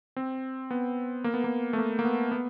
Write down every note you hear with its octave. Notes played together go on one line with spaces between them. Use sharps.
C4
B3
A#3
B3
A#3
A3
A#3
A#3
B3
B3